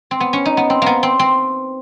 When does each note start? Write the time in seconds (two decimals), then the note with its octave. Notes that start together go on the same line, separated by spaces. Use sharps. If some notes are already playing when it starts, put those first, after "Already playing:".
0.11 C4
0.20 B3
0.33 C#4
0.45 D#4
0.57 B3
0.70 C4
0.82 A#3 B3
1.03 C4
1.19 C4